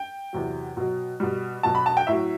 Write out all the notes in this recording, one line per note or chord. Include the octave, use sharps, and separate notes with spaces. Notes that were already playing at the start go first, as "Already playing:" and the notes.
Already playing: G5
E2 C3 F#3
B2 F#3
B2 G3
B2 F#3 A5
B5
A5
G5
A2 F#3 E5